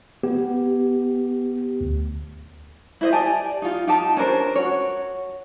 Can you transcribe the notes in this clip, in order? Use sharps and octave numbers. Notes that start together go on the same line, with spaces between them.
B3 G4
D2
E4 C5 D#5
G4 D5 G#5 A5
D#4 F4
D#4 G4 A5
C#4 D4 A#4 C5
F#4 C#5